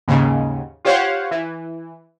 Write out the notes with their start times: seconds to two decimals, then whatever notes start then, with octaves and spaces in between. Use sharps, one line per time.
0.08 D#2 G#2 C#3
0.85 F4 G4 C5 C#5 F5 F#5
1.31 E3